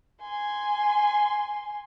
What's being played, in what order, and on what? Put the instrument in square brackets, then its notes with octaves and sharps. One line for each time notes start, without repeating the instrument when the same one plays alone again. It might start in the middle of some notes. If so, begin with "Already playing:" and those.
[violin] G#5 C6